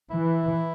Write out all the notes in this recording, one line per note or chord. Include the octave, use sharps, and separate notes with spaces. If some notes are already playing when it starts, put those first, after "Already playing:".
E3 E4